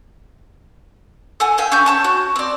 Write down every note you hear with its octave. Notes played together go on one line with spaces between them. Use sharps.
A4 F#5 G#5
E5 F5 G5 G#5
C#4 D4 C#6 G6
C#5 A5 C#6
F#4
C4 D5